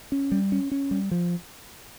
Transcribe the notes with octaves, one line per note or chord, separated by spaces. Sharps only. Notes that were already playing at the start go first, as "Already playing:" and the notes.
C#4
G3
C#4
C#4
G3
F3